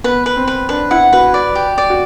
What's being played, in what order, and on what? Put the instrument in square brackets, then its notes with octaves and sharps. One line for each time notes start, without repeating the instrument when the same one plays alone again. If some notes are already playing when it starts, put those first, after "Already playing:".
[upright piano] B3 [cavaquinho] B4
[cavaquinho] B4
[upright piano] C4
[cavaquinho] B4
[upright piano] D4 [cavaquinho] B4
[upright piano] E4 [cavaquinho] F#5
[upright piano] F#4 [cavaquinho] B4
[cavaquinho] D5
G4
D5
[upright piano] F#4